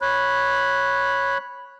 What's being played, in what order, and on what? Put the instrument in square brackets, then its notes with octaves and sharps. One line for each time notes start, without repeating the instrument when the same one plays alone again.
[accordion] C#5 B5 F#6